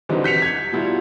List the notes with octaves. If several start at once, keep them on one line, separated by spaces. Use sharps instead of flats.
D3 E3 F#3 G3 C4 D#4
G6 B6 C#7 F7
G#6 B6
B2 F#3 G3 E4 F4